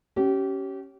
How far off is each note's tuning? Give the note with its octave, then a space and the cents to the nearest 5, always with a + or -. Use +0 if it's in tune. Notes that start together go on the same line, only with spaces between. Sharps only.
C#4 +0 G4 -30